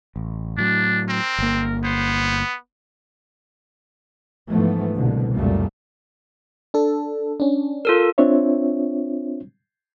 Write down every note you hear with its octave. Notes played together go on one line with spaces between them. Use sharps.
A1
A2 F#3 D4
C4 A#4
G1 A#3
B3 C5
G#2 E3 F3 A3 B3
C2 B2 D3
C#2 F#2 A#2 G3 A3
D4 A4
C#4 D4
F4 A4 A#4
C4 D4 F4 C5 C#5 E5